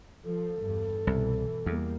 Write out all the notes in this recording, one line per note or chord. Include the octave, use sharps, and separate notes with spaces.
F3 A4
E2 G2
C2 B2 E3
E2 G3 A#3